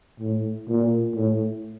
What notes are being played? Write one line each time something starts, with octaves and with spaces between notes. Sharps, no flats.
A2
A#2
A2